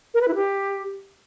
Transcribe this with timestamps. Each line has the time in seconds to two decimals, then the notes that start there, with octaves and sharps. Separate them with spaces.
0.14 A#4
0.21 B4
0.28 E4
0.35 G4